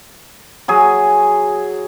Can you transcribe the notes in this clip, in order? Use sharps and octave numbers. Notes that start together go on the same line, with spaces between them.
F#3 G#4